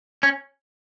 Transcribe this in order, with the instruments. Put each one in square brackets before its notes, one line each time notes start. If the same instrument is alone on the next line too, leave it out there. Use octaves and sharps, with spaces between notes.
[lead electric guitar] C#4